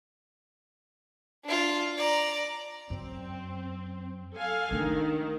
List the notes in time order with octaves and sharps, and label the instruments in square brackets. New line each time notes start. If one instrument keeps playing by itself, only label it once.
[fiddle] D4 F4
D5 A#5
[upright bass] F#2 [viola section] C4
[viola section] A4 F5 G#5
[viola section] D#3 [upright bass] A3 D4